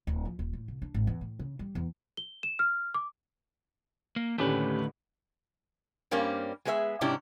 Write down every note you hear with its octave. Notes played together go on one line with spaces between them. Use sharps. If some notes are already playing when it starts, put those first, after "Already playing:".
D1
F3
D#1
A2
C2
D4
G#1
E2
A2
C#3
G3
E2
G7
E7
F6
D6
A#3
D#2 A2 D3 A3 C#4 G4 B4
G2 G3 A#3 C4 C#4
G#3 B3 G#4 D5 E5
G#2 C3 C#4 D4 E4 G4